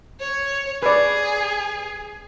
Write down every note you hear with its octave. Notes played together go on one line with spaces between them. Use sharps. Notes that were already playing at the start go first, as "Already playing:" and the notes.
C#5
G#4 B4 D5